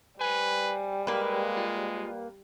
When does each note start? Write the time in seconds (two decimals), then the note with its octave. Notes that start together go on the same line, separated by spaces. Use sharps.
0.21 G3 B4 C5 G#5
1.07 G#3 A#3 B4
1.57 F4